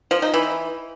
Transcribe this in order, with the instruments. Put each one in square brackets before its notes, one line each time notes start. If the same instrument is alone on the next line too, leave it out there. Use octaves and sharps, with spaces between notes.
[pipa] F3
D#4
E3